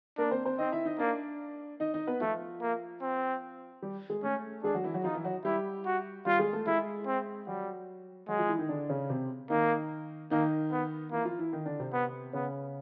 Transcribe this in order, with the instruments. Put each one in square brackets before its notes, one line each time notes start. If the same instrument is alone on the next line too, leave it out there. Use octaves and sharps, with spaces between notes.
[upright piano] A#3 A#4 [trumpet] D4
[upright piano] C4 C5
C4 C5
[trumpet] C4 [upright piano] D#4 D#5
[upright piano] E4 E5
D#4 D#5
[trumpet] A#3 [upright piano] D4 D5
[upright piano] D#4 D#5
D#4 D#5
B3 B4
[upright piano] F3 F4 [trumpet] A3
[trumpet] A#3
C4
[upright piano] G3 G4
G#3 G#4
[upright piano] A3 A4 [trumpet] C#4
[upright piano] G#3 G#4 [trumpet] D4
[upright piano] F#3 F#4
E3 E4
F#3 F#4
[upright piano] F3 F4 [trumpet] D#4
[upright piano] E3 E4
F#3 F#4
[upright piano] G3 G4 [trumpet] E4
[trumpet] F#4
[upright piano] G3 G4 [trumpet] F4
[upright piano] G#3 G#4
A3 A4
[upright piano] G#3 G#4 [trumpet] E4
[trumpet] C4
[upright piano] F#3 F#4 [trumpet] G3
[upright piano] F#3 F#4 [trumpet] G#3
[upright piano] F3 F4
E3 E4
D#3 D#4
D3 D4
C#3 C#4
C3 C4
[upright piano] D#3 D#4 [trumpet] A#3
[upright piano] D#3 D#4 [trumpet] A#3
[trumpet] B3
[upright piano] E3 E4 [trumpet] A#3
[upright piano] F3 F4
E3 E4
D#3 D#4
D3 D4
C3 C4
[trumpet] B3
[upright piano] C#3 C#4 [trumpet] B3